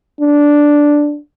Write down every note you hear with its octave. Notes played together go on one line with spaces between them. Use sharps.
D4